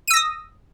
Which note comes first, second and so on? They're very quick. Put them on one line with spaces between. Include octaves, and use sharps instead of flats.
D#7 E6 A#6 D#6